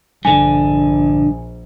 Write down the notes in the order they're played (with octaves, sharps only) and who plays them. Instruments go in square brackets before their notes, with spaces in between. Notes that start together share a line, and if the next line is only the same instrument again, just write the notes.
[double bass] A#1 [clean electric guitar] G2 D3 [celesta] G#5